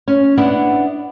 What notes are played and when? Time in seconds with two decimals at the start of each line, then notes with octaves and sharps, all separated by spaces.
0.08 C#4
0.37 B3 D4 E4 F#5